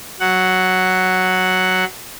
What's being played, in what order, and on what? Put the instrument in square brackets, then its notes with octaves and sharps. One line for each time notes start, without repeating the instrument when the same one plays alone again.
[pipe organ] F#3 F#5